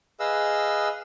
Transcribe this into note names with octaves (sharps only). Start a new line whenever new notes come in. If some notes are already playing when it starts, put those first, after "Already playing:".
G#4 B4 D#5 F5 E6